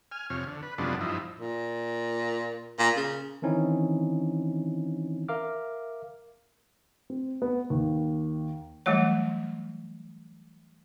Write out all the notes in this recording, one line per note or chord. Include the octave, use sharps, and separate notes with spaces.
G#5 F6
F2 C3 C#5 F6
D3
B4
F#2 C3 F3 G#3 B3 D4
G2 F3 D#4 E4
A#2
A#2
C#3
D#3 E3 C4 C#4 D#4 E4
A#4 E5 F5 D6 F6
C4
B3
D#2
E3 F#3 G3 A3 C#5